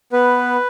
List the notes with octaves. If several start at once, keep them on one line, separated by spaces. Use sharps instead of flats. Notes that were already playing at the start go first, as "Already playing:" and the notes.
B3 B4